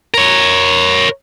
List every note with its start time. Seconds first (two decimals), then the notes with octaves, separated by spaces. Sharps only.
0.14 A#4 C#5